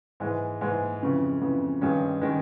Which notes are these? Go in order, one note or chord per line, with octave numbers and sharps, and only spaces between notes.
G#2 E3 G#3
G#2 E3 G#3
F2 C#3 E3
F2 C#3 E3
G2 D#3 G#3 C#4
D#3 G#3 C#4